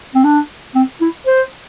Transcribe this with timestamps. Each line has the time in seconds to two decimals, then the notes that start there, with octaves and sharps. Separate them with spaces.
0.15 C4
0.24 D4
0.75 C4
1.01 E4
1.27 C5